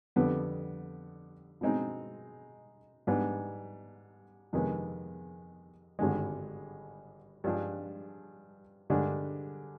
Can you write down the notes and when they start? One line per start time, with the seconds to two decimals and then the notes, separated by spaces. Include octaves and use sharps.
0.16 F2 D3 G3 B3
1.61 B2 G#3 C4 D#4
3.07 G#2 G3 B3 D4
4.53 F2 C3 D#3 G#3 B3
5.99 G#1 G2 D3 G#3
7.44 G2 F3 G#3 D4
8.90 G2 D3 G#3 D4